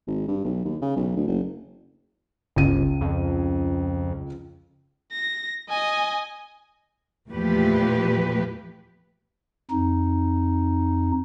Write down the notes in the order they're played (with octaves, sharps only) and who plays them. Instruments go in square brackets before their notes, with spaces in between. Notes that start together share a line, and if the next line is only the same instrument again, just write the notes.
[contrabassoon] G#1
G2
B1
D#2
C#3
B1
D2
F#1
[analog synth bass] G1 [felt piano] C#2 D#7
[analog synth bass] F2
[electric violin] A#6
D#5 G#5
[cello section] E2 A#2 F3 A3 G4 B4
[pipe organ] F2 D#4